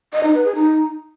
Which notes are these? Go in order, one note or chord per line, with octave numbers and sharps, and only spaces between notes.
D#5
D#4
B4
G#4
D#4